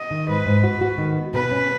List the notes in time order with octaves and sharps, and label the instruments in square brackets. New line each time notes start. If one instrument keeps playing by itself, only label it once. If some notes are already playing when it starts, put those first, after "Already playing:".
Already playing: [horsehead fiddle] D#5
[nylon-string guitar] D#3
[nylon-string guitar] G#2 [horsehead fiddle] B4
[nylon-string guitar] G#2
F#4
F#4
D#3
B3
[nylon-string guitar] B2 [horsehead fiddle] B4
[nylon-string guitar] C#4